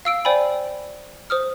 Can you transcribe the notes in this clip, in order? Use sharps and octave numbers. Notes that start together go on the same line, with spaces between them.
F5 E6 D7
C5 D5 G5 G#5 B5
C5 D#6 F6